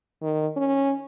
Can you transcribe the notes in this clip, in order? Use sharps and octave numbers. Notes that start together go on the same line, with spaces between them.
D#3
C#4